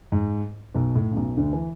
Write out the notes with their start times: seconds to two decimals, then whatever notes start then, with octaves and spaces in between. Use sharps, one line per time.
0.12 G#2
0.75 B1 B2
0.95 A2
1.12 C#3
1.17 B1 B2
1.37 D2 D3
1.53 E3